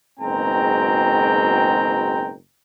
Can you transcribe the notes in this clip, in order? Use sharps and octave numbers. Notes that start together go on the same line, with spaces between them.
F#1 G#2 B2 C4 G5 A#5